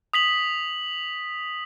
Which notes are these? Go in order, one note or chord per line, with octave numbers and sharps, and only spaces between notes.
D#6 B6 F#7